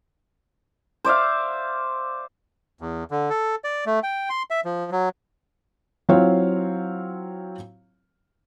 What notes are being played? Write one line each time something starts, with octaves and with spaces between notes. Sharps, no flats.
C5 D5 E5 F5
E2
D3
A4
D5
A3
G5
C6
E5
F3
F#3
F#3 C4 E4 F4 C#5 F5